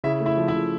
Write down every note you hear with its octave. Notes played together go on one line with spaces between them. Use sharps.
C#3 E4 E5
A3
E4 E5
F3
E4 E5
C#3